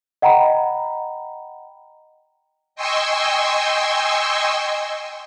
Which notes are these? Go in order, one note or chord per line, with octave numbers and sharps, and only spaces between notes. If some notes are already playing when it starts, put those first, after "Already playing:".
D#5 F#5 G5 A#5 B5
D#5 G5 G#5 C6 C#6 E6